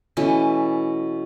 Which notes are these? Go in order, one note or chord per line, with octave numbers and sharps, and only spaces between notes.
B2 E3 A3 C#4